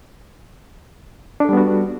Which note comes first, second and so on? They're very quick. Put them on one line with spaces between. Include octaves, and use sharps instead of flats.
D4 A4 G3 B3 F#4